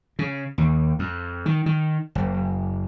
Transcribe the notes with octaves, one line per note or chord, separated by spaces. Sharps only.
C#3
D#2
F2
D#3
D#3
F#1